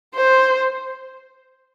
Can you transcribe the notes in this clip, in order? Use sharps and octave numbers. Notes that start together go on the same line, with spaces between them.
C5